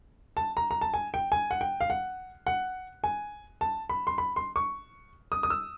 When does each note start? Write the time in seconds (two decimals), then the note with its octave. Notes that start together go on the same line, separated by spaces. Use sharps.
0.37 A5
0.57 A#5
0.71 A#5
0.81 A5
0.94 G#5
1.14 G5
1.32 G#5
1.51 F#5
1.61 G5
1.81 F5
1.90 F#5
2.47 F#5
3.04 G#5
3.61 A5
3.89 B5
4.07 C6
4.18 B5
4.36 C6
4.56 C#6
5.32 D#6
5.43 D#6
5.50 E6